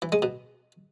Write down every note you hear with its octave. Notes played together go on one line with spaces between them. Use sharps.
E3
G#3
B2